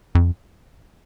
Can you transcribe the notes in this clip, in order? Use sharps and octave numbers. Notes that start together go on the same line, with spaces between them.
F2